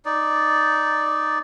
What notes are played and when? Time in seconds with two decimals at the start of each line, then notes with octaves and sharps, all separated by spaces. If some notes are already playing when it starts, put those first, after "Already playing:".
0.05 D#4 D5